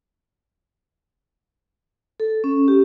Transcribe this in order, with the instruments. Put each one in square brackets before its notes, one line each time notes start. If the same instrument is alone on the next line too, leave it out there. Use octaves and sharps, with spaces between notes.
[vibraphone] A4
C#4
G4